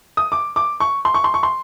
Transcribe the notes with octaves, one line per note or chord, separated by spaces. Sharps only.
D#6
D6
D6
C#6
C6
C#6
C6
C#6
C6